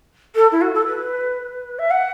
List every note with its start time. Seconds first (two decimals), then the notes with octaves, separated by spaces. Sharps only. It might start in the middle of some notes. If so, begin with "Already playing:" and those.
0.35 A4
0.52 E4
0.61 F#4
0.74 A4
0.87 B4
1.79 E5
1.91 F#5